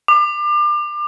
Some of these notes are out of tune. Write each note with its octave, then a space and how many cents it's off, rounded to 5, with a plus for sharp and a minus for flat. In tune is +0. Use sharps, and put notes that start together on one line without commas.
D6 +30